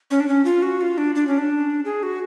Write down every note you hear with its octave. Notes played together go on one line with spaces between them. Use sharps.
C#4
D4
C#4
F4
F#4
F4
D4
D4
C#4
D4
G#4
F#4